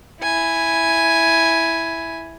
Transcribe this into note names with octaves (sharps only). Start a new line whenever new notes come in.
E4 G#5